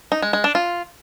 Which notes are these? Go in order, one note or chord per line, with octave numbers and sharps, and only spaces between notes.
D#4
G#3
G#3
D4
F4